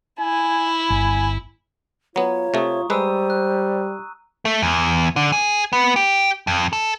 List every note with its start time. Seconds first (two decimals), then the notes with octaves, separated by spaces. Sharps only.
0.20 E4 G#5
0.90 G1 G#5
2.16 F#3 B3 F4 C#5 A#5
2.54 C3 A3 C#6 D#6
2.90 G3 G#3 B4 C5 A#5 E6 D#7
3.30 F#6
4.45 A3
4.62 E2
5.16 D3
5.32 G#4
5.73 B3
5.96 G4
6.47 F2
6.73 A4